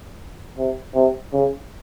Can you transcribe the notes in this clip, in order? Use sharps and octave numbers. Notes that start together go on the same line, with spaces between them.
C3
C3
C#3